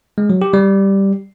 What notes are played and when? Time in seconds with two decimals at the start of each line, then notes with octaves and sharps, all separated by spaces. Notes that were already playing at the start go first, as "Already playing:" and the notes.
0.18 G#3
0.30 F#3
0.42 G4
0.53 G3